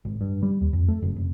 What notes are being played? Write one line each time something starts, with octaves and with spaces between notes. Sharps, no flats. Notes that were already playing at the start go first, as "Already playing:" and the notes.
G#1
G2
G3
D#2
F2
A3
F#1
F1